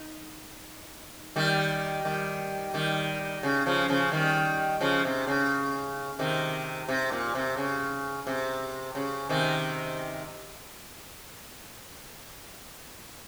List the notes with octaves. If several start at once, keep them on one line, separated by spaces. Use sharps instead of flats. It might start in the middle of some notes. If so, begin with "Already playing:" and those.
Already playing: D#4
D#3 G3
D#3 G3
D#3 G3
C#3
C#3 F3
C#3 F3
D#3 G3
C#3 F3
C3
C#3
C3 D#3
C3
A#2
C3
C#3
C3
C#3
C3 D#3